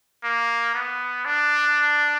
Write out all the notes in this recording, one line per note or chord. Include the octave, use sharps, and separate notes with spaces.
A#3
B3
D4